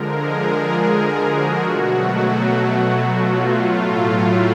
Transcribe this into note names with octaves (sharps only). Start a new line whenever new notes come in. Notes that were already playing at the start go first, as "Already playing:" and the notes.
Already playing: D3 F3 G#3 A#4
G#4
F#4
B2 F#3 A3
F4
A2 F#3 A3
E4